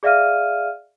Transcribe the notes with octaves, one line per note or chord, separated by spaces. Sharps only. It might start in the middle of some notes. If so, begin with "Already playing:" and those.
G#4 D5 E5 F5 F6 D#7